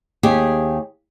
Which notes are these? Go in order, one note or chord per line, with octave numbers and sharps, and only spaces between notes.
D#2 G4 G#4